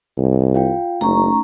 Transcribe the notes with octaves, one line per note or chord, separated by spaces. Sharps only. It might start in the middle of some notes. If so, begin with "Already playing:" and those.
C2
F4 F5 G5
F#1 A3 C#4 D#4 A#5 C#6